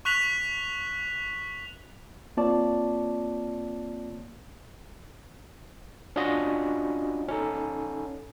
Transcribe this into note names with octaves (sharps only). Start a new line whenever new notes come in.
C#6 F#6 B6 F7 F#7
A#3 C4 F4 C#5 D5 A5
C#4 D4 F4 F#4 D#5
C#4 D#4 A4